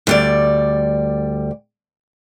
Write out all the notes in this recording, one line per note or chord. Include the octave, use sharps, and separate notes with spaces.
D2 G3 D5